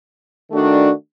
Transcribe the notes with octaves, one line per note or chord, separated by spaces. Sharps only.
D#3 A3 D4 F#4